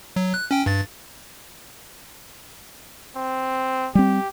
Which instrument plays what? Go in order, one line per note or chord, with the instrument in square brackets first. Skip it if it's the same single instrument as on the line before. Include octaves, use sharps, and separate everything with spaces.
[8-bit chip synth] F#3
F#6
C#4 G5
G2 A6
[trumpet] C4
[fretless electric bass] G3 C4 [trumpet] G4